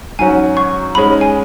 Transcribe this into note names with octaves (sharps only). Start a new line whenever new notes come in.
G#2 F#3 C#4 F#4 G#5
C#6
G#2 G#3 C#4 B5
G#5